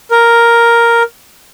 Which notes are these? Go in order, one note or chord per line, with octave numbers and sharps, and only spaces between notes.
A#4